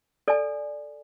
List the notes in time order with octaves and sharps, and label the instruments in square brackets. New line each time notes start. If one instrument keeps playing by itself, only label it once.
[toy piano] A4 D5 G#5